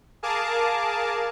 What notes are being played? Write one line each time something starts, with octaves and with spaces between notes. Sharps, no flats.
G#4 A#4 F5 A5 D6